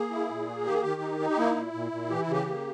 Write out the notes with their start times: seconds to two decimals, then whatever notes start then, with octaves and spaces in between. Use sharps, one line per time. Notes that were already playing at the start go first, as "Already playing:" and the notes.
Already playing: A#3 G#4
0.11 E4
0.30 A#2
0.48 A#3
0.66 D#3 G4
0.74 G#4
0.82 D#3 G4
1.01 D#4
1.20 D#4
1.30 G4
1.37 A#3 E4
1.56 A#2
1.73 A#2
1.92 A#2
2.10 E3 G4
2.21 E4
2.28 C#3 G4
2.46 A#3